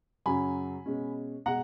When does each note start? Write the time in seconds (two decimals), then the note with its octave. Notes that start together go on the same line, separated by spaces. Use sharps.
0.26 F#2 C#3 F#3 G#5 B5
0.86 B2 G#3 C#4
1.46 B2 G#3 F#5 A#5